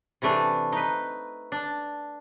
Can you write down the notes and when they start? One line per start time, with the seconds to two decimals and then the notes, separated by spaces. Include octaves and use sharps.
0.22 C3 E3 A3 D4
0.72 D#4 B4
1.52 D4